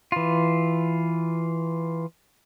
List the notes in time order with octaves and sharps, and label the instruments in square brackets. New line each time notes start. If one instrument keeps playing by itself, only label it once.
[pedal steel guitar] E3 F4